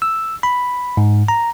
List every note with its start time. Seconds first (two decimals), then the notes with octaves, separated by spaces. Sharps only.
0.02 E6
0.43 B5
0.97 G#2
1.28 A#5